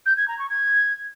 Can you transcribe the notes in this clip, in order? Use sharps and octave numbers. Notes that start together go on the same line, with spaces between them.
G6
G#6
A#5
C#6
G#6